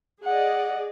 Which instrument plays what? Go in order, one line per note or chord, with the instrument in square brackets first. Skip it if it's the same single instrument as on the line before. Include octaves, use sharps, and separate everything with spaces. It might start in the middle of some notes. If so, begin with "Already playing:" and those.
[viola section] G#4 D5 D#5 [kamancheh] F#5